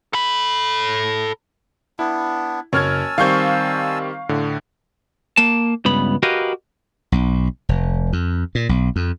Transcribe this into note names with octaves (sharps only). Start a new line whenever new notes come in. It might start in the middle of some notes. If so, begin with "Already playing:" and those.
A4 B5
B3 D4 E4
F#1 C#5 G#5 A5 E6 F6 G#6
D#3 G3 C4 F5 C#6 G6
A2 D3
A#3 A5
C#2 G2 B3 B5
F#4 G4 A#4 B4 D#5 F5
B1
F1
F2
A#2
B1
F2